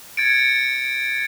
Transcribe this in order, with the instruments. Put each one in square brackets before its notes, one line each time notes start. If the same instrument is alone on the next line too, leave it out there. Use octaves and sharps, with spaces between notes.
[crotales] G#6 A6 C#7 D7